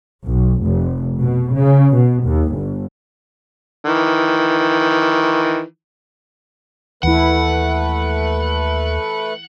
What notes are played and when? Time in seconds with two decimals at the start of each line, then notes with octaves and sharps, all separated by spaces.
0.25 B1
0.64 F1
1.19 B2
1.54 C#3
1.95 B2
2.24 D#2
2.54 G1
3.85 D#3 E3
7.03 D#2 E3 A3 E4 B4 F#5